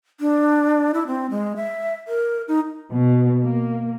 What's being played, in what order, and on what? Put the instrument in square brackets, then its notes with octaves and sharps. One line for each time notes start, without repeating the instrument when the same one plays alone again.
[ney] D4
E4
C4
G#3
E5
A#4
D#4
[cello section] B2
A#3